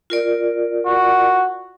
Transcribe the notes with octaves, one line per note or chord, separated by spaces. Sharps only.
F4 A#4 D5
F#4